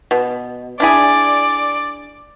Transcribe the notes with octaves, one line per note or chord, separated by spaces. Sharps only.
B2
D4 E4 G#4 D5